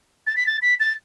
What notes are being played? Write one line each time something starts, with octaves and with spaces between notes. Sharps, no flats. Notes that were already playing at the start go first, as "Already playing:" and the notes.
A6
B6
A6
B6
A6